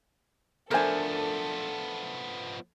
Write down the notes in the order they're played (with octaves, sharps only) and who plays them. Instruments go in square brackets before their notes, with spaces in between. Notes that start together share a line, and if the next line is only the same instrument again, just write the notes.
[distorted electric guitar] F3 B3 [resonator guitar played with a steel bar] A3 D4 [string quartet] A4 [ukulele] A#4 C5 G#5